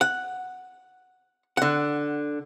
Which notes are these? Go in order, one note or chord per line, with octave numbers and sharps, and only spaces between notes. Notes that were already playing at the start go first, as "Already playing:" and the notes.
F#5
D3 F#5